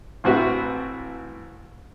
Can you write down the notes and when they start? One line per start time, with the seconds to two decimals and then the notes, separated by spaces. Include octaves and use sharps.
0.24 A1 C4 F#4 B4 E5